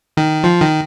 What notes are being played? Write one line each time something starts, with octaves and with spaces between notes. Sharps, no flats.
D#3
F3
D#3